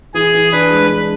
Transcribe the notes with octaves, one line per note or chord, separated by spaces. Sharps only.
E3 G#4
E3
D4 B4
G#3
D4